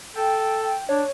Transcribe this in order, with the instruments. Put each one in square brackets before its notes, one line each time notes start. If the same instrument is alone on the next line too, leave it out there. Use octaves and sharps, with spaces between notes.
[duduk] A4 [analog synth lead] G5
[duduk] D4 [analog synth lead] C#5